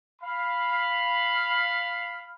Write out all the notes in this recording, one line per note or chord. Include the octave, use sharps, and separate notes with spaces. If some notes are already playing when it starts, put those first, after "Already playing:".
F5 B5